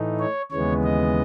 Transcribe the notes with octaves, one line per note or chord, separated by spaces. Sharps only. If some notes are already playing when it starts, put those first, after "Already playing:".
Already playing: A2 E3 A3 D#4
C#5
D#2 C#3 E3 G#3 B3 C#5
D#5